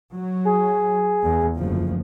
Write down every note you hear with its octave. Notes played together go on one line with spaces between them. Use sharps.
F#3
G#4
E2
F#1 D2 F3